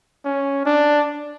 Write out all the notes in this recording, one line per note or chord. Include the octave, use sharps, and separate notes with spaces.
C#4
D4